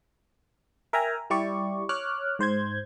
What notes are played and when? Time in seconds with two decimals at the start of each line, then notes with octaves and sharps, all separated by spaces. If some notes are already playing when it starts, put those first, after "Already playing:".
0.93 A#4 E5 G5 G#5 A#5
1.30 G3 E4 G4 D5 C#6
1.89 C#5 D6 F6 F#6
2.39 G#2 C5 G6 G#6